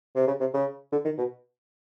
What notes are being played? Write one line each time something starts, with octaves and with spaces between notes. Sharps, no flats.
C3
C#3
C3
C#3
D3
D#3
B2